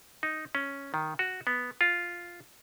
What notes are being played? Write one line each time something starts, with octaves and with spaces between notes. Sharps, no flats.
D#4
C#4
D#3
F#4
B3
F4